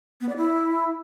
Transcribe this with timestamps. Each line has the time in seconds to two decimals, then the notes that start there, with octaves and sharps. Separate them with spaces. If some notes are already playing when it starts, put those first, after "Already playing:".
0.21 B3
0.29 D5
0.37 E4